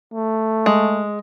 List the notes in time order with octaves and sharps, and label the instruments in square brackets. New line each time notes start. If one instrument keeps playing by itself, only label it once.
[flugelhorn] A3
[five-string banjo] G#3